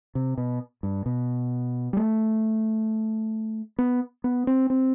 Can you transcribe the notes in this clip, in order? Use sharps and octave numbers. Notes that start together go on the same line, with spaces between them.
C3
B2
G2
B2
G3
A3
B3
B3
C4
C4